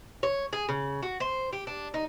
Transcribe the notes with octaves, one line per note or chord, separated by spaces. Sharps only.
C#5
G#4
C#3
F#4
C5
G4
D4
D#4